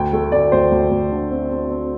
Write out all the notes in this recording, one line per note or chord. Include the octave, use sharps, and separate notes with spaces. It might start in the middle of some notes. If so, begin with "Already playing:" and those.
Already playing: D2 G5
A3
D2 D5
D2 C5
D2
D2
D3
C4
C4
C4